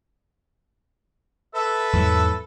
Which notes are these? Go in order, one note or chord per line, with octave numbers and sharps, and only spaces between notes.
A4 B4 E5
E2 G#2 F#3